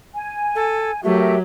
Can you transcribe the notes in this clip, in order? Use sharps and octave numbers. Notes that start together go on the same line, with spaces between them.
G#5
A4
F#3 A3 G4 A#4 E5